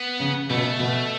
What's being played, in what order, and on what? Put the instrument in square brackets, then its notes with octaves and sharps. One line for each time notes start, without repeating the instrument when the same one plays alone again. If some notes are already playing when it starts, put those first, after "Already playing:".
Already playing: [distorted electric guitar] B3
[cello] C#3
[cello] B2 [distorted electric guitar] A3
[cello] B2